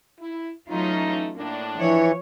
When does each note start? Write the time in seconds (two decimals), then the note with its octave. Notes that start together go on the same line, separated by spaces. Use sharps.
0.20 E4
0.69 E3 F#3 A3 C#4 D#4 F4
1.37 A2 A#3 D4
1.76 E3 F3 C#5